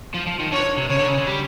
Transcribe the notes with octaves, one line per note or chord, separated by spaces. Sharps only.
F3
F3
D#3
D3 C#5
C3
C#3 C#5
D3
C#3
D3
G3